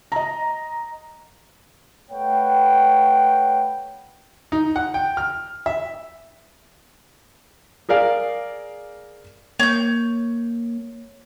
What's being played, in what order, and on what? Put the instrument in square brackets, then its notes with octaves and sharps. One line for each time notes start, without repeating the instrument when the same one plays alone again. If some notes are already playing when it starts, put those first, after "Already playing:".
[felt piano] D#5 A#5
[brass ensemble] A3 B4 C#5 F#5 G5
[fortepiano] D#4
F#5
G5
F6
E5
G#4 A#4 D5 F5
[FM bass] A#3 [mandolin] C#5 G6